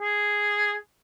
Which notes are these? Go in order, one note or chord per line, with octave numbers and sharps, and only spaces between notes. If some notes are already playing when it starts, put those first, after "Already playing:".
G#4